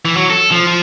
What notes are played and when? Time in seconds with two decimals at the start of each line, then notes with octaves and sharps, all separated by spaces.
0.05 E3
0.16 F#3
0.30 A4
0.51 F3
0.67 F3